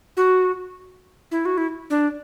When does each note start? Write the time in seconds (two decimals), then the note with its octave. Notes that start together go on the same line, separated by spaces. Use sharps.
0.17 F#4
1.31 E4
1.45 F#4
1.58 E4
1.90 D4